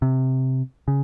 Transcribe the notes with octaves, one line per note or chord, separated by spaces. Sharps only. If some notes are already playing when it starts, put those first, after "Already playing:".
C3
C#3